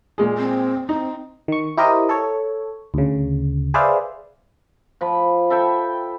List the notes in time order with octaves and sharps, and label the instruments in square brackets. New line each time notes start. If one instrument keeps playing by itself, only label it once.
[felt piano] A#2 G#3 G#4
[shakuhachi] C4
[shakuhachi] C4 [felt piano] D#4
[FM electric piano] D#3 C#6
E4 G4 A#4 C5 D#5
A4 C#5
D2 C#3
G#4 B4 C5 D5 E5 F5
[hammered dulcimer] F3 B5
A4 E5 G5 B5